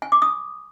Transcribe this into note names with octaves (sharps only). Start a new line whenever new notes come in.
G#5
D6
D#6